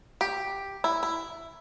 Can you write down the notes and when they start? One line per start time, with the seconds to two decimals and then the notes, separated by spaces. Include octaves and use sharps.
0.21 G4
0.84 E4
1.03 E4